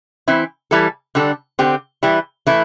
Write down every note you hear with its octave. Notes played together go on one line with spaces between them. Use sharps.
E3 C4 E4
E3 G3 E4 A4
D3 G3 D4 A4
D3 C4 G4
E3 G3 E4
E3 A3 E4